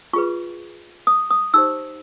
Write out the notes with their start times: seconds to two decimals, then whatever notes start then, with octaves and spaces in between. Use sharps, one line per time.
0.13 F4 G#4 B4 C#6
1.07 D#6
1.30 D#6
1.54 D#4 G4 C5 E6